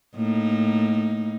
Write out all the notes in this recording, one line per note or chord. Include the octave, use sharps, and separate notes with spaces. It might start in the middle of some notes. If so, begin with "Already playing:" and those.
A2 A#3 D#4